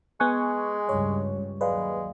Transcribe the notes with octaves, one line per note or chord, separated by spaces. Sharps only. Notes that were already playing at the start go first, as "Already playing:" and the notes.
G#3 B3 G#5 C#6 F#6
C#2 G2 G3 C#5
D#2 F#3 G#3 B4 D5 F5